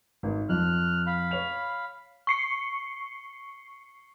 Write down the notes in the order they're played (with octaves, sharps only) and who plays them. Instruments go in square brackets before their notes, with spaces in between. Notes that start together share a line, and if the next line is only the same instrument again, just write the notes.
[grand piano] G#1
[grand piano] F2 [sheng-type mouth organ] F6 F#6
[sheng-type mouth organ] F5 B5
[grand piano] C#5 F7
[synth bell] C#6 C7 C#7